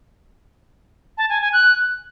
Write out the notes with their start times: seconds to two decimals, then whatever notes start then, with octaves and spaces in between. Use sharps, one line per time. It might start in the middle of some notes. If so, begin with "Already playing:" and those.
1.18 A5
1.29 G#5
1.41 G#5
1.53 F#6